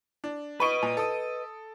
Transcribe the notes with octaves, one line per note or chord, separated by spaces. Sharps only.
D4
B4 D#5 B5 C#6 D7
A#2
A4 D#6